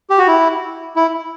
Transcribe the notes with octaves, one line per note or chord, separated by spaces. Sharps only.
G4
F#4
E4
E4